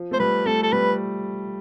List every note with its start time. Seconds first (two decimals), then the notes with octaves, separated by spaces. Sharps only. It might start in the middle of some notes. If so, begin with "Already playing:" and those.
Already playing: F3
0.11 A3 C5
0.19 G3 B4
0.46 A3 A4
0.63 A4
0.72 G3 B4